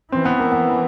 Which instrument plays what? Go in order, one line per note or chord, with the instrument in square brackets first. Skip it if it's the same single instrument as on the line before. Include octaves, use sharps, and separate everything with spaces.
[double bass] E3 [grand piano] C4
[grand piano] B3
A#3
B3